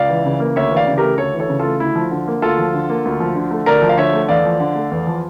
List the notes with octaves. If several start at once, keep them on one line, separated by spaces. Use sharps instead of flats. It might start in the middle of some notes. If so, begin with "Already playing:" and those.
Already playing: C#2 D5 F5
E3
C#3
A#3
D2 C#5 E5
E3
D5 F5
C#3
A3 G4 A#4
D2 A4 C#5
E3
A4 C#5
C#3
F4 A4
A3
D2 E4
F3
D3
A#3
D2 F4 A4
F3
D3
A#3
D2
F3
D3
A3
D2 A#4 D5
F3
F5
D3 C#5 E5
A3
E2 D5 F5
F3
D3
A3
E2
F3